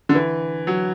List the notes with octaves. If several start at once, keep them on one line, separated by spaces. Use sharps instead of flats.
D3
E3
F#3